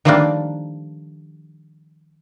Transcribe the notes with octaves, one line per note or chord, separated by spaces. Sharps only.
D#3 F3 G3 A3 A#3 D4